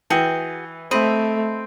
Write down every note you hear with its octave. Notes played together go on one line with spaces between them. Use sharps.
E3 F#4 G#4 G5
A3 C4 D#5 B5